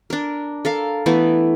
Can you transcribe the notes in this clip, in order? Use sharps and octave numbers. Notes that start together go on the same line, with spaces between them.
D4 A#4
A4 A#4 F5
E3 A3 B3 E4